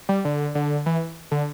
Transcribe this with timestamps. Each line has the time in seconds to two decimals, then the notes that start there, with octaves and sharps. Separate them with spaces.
0.09 G3
0.25 D3
0.55 D3
0.86 E3
1.31 D3